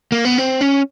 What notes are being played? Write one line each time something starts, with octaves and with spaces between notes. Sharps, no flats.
A#3
B3
C4
C#4